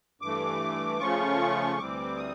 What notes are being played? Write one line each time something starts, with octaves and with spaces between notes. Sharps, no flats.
G2 E3 A3 D6
C#3 F3 A3 C#4 F4 C#6
D2 C3 E3 G3 C4 D6
D#6